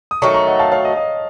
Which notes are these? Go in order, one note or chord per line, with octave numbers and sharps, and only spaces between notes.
D#6
D#3 F#3 A3 A#5 C#6
A#5 C#6
D#5 F#5
F5 A5
C#5 F5
D#5
D#5